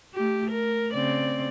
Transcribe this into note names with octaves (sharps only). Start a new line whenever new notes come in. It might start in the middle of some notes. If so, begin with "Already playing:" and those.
A3 G4
A#4
C#3 C4 D5